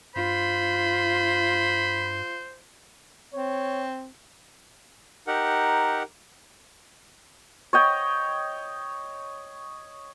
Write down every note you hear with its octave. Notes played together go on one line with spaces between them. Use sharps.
G2 F4 C5 B5
C4 C#5
D#4 G4 A#4 F#5
C#5 D#5 G5